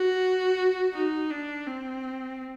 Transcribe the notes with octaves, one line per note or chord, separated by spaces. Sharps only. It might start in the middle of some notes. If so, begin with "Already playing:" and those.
Already playing: F#4
D#4
D4
C4